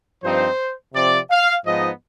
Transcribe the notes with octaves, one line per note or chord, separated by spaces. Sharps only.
G2 F3 C4 D#4 C5
C3 F3 C4 D5
F5
G#2 F3 B3 D#4 D#5